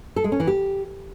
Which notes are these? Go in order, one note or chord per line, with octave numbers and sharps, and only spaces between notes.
A4
G#3
C#4
E3
G4